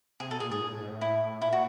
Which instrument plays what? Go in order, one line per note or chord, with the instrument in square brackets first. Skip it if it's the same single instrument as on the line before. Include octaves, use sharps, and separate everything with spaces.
[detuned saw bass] C3 [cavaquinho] G#4
[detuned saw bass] B2 [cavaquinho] A4
[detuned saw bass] A#2 [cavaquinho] G#4
[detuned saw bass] G#2 [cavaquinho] G#4
[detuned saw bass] A#2
A2
G#2
A2
[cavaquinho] E4
[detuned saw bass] A#2 [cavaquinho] E4
[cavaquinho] F#4